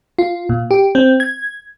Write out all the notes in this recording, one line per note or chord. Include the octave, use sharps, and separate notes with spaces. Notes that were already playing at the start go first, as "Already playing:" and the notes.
F4
A#2
G4
C4
G#6